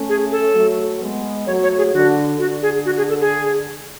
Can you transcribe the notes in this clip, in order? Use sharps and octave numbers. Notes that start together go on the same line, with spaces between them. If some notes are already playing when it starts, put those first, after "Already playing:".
Already playing: A3 C#4
G#4
A4
F#3 A3
G#3 B3
F#3 A3 C#5
C#5
G#4
D3 F#4
D3 F#4
G#4
F#4
G#4
A4
G#4